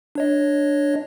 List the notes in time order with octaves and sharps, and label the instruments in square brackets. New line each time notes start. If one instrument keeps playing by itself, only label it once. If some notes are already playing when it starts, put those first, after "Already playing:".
[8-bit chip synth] D4 C#5 D#5